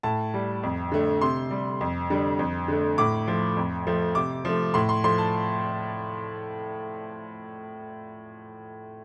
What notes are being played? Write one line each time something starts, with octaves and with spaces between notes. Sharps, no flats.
A2 A5
G3
F2
D3 A3
C3 C6
G3
F2
D3 G3
F2
D3 A3
A2 D6
F3 A3
F2
F3 A3
C3 D6
F3 A3
A2 C6
C6
F3 A3 C6
A5